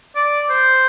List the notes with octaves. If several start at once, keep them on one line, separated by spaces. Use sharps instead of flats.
D5
C5